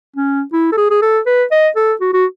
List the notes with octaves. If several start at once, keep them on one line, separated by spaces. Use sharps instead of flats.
C#4
E4
A4
G#4
G#4
A4
B4
D#5
A4
F#4
F#4